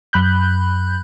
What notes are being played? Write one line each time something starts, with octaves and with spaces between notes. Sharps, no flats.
F#2 B5 F#6 G6